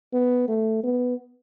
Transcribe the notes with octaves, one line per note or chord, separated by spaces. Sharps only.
B3
A3
B3